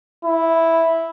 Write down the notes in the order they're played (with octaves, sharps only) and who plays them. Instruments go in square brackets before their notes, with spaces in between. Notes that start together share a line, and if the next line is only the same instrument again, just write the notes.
[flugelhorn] E4